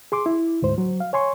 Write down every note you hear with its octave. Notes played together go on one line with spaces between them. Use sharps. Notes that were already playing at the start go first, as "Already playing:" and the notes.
G#4 C6 D6
E4
D2 G#2 C5
F#3
F5
C#5 G#5 C6 C#6